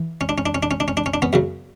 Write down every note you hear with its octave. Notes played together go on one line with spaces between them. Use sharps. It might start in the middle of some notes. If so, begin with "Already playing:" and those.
Already playing: E3
C#4
D4
C#4
D4
C#4
D4
C#4
D4
C#4
D4
C#4
D4
B3 C#4
F#2 C#3 F#3